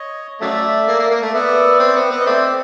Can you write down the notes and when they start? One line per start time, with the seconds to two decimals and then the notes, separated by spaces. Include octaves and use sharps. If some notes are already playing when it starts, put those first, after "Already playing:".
Already playing: C#5 D#5
0.41 C#3 F#3 A3 D5 E5
0.88 A#3
0.99 A#3
1.11 A#3
1.23 A3
1.34 B3 D5 E5
1.80 C4
1.96 B3
2.11 B3
2.20 D#5
2.26 A3 C4 D5 E5